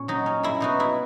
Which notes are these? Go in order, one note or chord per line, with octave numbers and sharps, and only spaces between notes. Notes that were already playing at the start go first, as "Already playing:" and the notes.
Already playing: A#2 C#4 C#5
F#3 D#4
C#4
A#3 E4
B2 D#4 F#4
B2 E4